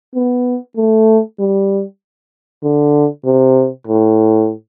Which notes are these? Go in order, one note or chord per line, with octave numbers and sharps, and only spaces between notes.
B3
A3
G3
D3
C3
A2